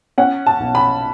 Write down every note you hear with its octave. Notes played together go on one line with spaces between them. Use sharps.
C#4 F#5
A5
B1
B5